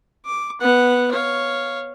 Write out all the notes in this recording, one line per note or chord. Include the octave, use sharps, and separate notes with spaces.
D6
B3 F#5
C#5 F5